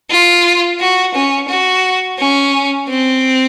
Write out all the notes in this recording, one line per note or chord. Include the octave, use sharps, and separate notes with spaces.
F4
F#4
C#4
F#4
C#4
C4